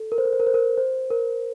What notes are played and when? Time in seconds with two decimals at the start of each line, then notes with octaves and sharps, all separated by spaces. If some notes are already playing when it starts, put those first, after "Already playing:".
Already playing: A4
0.12 A#4
0.18 C5
0.25 A#4
0.33 C5
0.40 A#4
0.47 C5
0.54 A#4
0.77 C5
1.10 A#4